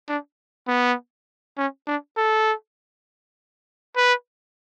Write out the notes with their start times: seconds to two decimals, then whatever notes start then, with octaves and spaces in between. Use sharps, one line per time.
0.09 D4
0.68 B3
1.58 C#4
1.87 D4
2.17 A4
3.96 B4